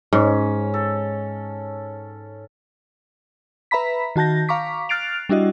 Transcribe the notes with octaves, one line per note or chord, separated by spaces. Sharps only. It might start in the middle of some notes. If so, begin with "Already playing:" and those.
G#2 C#4
A4
B4 E5 A#5 B5 B6
D#3 F#4 A5 G6 A#6
F5 A#5 C#6 D6 B6
F6 F#6 A6 C7 D7 F7
G3 D4 E4 F#4 D#5